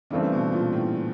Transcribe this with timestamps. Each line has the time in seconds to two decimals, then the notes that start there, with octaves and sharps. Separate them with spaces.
0.10 G2 C#3 E3 A3 C4
0.32 B2
0.52 A#2
0.73 A2